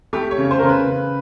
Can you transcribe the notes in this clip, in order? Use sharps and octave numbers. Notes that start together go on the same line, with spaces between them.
A3 G4
C#5
C#3
C5
C#3 A#4
B4
C#3